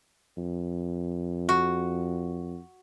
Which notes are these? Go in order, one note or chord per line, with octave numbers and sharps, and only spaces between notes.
F2
F#4